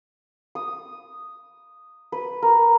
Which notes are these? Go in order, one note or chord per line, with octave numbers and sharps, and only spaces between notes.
D#6
B4
A#4